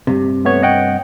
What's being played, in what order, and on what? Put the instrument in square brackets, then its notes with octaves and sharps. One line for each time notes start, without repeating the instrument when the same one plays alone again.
[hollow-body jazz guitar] G2 C3
[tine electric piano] A3 B3 C#5
D#5 F#5 G5